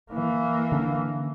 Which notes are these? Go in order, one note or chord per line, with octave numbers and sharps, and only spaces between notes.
E3 A#3
D3 C#4 D4